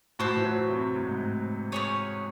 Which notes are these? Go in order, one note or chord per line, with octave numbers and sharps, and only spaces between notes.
A2 F#4 C5 E5 A5
E3
F#3
C3
A2
G#2
A2
C#4 G#4 C#5 G#5